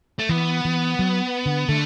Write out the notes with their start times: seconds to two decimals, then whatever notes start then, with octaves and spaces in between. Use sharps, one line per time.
0.19 A3
0.29 E3 B3
0.65 E3
0.99 F#3
1.46 D3
1.69 D3 A3